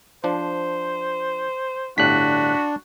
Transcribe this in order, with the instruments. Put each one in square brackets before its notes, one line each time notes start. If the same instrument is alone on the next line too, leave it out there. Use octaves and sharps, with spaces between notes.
[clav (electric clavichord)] F3 D4 [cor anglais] C5
[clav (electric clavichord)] G1 A2 G3 [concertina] D4 [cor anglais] F#4 [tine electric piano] F#6 B6